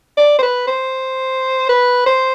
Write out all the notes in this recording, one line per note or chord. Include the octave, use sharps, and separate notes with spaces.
D5
C5
B4
C5
B4
C5